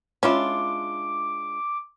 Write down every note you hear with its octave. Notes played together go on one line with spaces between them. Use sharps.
G#3 C#4 D4 E4 F4 D6